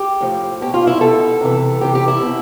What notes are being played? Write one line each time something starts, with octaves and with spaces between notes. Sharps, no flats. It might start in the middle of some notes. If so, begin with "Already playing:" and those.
Already playing: G4
A2 F3
B2 G4
F4
E4
B2 A4
C3 E3
C3 E3 G4
G4
E4
B2